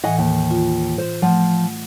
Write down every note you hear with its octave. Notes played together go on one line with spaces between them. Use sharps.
A2 E3 D#5 F#5 G#5
D#2
F4
C5
F3 A3 F#5